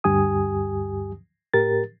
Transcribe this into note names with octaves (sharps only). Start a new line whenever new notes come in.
D2 G2 G4 G#5 D#6
A2 G4 A#4 A6